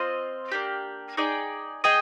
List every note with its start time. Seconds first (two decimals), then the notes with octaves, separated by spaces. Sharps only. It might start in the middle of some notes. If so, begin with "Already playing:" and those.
Already playing: C4 F4 C5 D#5
0.52 A#3 D4 G4
1.17 D#4 G#4 D5 G5
1.84 G#4 D#5 G5